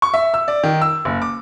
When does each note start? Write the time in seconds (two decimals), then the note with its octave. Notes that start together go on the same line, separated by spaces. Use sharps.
0.02 C#6
0.14 E5
0.34 E6
0.48 D5
0.64 D#3
0.82 E6
1.05 F#1
1.22 D6